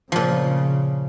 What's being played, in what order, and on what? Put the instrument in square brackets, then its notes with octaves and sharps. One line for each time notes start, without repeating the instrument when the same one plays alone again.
[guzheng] A#2 F3 [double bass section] C#3